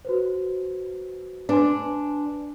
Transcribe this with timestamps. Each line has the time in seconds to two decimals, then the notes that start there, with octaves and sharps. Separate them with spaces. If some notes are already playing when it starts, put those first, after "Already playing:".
0.05 F#4 B4 C5
1.49 D4 B4 G#5 C6